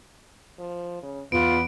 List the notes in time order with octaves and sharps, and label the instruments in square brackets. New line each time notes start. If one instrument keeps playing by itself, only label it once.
[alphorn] F3
C#3
[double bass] E2 [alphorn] B3 [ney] F4 [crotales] D7